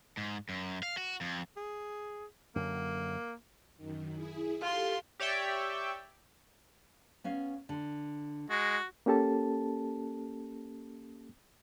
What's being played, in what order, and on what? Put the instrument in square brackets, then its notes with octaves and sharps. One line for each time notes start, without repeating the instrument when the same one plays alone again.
[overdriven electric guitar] G#2
F#2
F5
F#4
F2
[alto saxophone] G#4
[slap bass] F#2 D3 F#3 [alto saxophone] A#3
[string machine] F#2 D#3
E4 G#4
[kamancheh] F4 C6 [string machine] G4 A4
[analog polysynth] G4 C#5 D5 E5 G5
[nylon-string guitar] B3 C#4 F5
D3
[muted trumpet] G#3 [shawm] F#4
[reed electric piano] A#3 C#4 G4 A4 A5